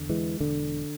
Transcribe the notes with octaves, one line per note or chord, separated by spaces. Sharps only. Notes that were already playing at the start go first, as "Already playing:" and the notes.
Already playing: E2 D3
E3 G#3
E1 D3